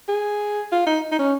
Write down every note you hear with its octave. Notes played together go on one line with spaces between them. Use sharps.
G#4
F4
D#4
D#4
C#4